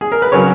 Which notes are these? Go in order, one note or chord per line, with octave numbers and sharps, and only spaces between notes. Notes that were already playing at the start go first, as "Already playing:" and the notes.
G#4
A#4
B4
C#3 F#3 A#4 C#5